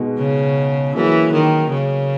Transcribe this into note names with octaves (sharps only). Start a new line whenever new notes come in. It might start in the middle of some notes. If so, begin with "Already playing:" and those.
Already playing: B2 G#3 D#4 F#4
C#3
E3 F#3 A#3 C#4 G#4
D#3
C#3